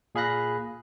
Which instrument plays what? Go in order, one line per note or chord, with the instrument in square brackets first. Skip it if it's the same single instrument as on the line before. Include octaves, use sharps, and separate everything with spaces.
[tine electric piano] A#2 G#4 F5 B5 F#6 A#6